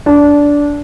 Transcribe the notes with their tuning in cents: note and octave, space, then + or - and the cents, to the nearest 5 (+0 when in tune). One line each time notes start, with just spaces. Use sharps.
D4 -15